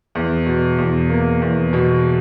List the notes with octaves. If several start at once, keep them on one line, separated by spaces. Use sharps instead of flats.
E2
B2
E2
A#3
E2
B2